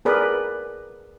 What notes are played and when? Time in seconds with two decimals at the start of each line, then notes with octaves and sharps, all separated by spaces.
0.05 G#4 A#4 B4 D5